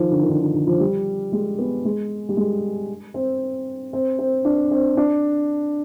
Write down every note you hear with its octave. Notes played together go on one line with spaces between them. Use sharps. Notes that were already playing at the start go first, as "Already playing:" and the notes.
Already playing: D#3 F3
D3
D#3
D3
D#3
D3
F3
G3
G#3
B3
G#3
G3
G#3
C4
C4
C4
D4
C4
D4